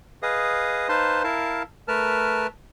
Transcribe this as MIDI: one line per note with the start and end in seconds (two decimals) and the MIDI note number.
0.23 0.88 68
0.23 0.88 71
0.23 0.88 75
0.23 0.88 77
0.23 0.88 87
0.89 1.23 63
0.89 1.23 71
0.89 1.23 72
0.89 1.23 77
0.89 1.23 81
0.89 1.23 84
1.24 1.63 64
1.24 1.63 70
1.24 1.63 77
1.24 1.63 81
1.88 2.47 57
1.88 2.47 70
1.88 2.47 71
1.88 2.47 81
1.88 2.47 89